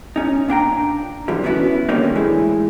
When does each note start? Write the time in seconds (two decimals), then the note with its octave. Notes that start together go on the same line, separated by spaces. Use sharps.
0.16 C#4 D#4
0.48 A#2 D4 G5 A#5
1.28 C#2 D3 E3 F3 G3
1.43 B3 C#4 D4 E4 F#4
1.89 D3 D#3 G3 A#3 C#4 D#4
2.15 A2 E3 G#3 E4